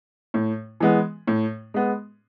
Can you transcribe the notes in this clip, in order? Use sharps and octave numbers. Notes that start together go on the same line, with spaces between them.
A2
E3 G#3 B3
A2
G#3 B3